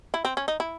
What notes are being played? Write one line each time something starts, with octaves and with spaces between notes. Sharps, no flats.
E4
C4
C#4
D#4
E4